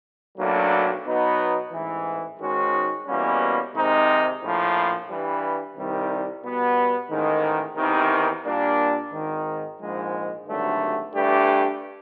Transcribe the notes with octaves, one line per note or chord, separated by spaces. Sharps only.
B1 A2 F#3 A#3 D4
B2 F#3 B3 D#4
A1 G#2 E3
G#2 D#3 G#3 C#4 F#4
E2 B2 G3 A#3 C#4
C3 D#3 G#3 C4 D#4
A#1 A2 F3
G2 E3 G3
C2 C3 D#3 G3
B2 G3 B3
A1 G#2 D#3
E2 C3 D#3
A#2 G3 A#3 D4
G#1 G#2 D#3
A#1 G#2 F3 G#3
G#1 G2 D3 F#3 A3
G2 E3 A3 D4 G4